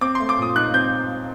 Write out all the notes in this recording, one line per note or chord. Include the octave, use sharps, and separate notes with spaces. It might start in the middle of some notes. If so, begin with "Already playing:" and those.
C4 D6
C6
A3
D6
A#2 D#6
D#4 F#6
C4 G6